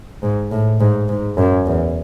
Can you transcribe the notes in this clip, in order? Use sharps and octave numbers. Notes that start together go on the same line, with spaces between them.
G#2
A2
G#2
G#2
F#2
E2